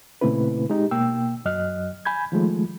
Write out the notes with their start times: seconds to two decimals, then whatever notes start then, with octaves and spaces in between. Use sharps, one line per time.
0.21 A#2 C#3 A3 C4 E4 B4
0.70 G#3 D#4 G4
0.91 B2 A#3 G5 E6
1.45 F#2 F#3 D#5 F6 F#6
2.05 G#5 B5 G6 G#6
2.32 D#3 F3 G#3 A3